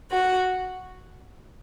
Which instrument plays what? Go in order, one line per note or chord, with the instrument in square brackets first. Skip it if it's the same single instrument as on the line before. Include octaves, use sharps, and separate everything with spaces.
[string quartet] F#4